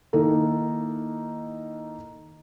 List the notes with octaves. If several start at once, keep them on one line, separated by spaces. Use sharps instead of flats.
D#3 A#3 D#4 E4 A4